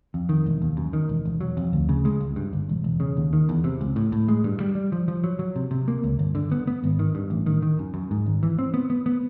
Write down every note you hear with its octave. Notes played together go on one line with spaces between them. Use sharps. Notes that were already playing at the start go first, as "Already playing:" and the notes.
F2
D#3
E1
D#2
F#2
D#3
E1
E1
F#3
F2
D2
C#3
G#3
C#2
G2
G1
E1
E1
C#3
D#2
D#3
E2
C3
C#2
A2
A2
G#3
G2
G3
G3
F3
F3
F#3
F#3
C3
C3
A#3
C#2
G1
D3
B3
B3
G#1
D#3
G2
A1
D#3
D#3
F#2
F#2
G#2
G#1
E3
C4
B3
B3
B3